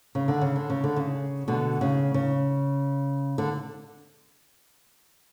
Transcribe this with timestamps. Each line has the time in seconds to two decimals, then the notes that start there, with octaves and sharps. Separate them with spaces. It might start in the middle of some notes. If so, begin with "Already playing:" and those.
0.15 C#3
0.28 D3
0.41 C#3
0.56 D3
0.70 C#3
0.84 D3
0.96 C#3
1.48 B2 D3
1.81 C#3
2.14 C#3
3.38 D3